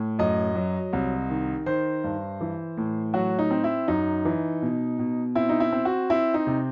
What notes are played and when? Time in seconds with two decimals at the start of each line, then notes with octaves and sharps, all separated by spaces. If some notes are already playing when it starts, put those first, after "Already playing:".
Already playing: A2
0.19 F#2 D#5
0.55 F#3
0.93 C2
1.30 D#3
1.66 D#3 C5
2.04 G2
2.41 E3
2.77 A2
3.14 F#3 F#4
3.38 D#4
3.51 C4
3.64 E4
3.88 F#2 D#4
4.25 E3
4.62 B2
4.99 B2
5.35 C4 E4
5.49 D#4
5.60 E4
5.72 C4
5.85 F#4
6.10 C4 E4
6.34 D#4
6.47 C3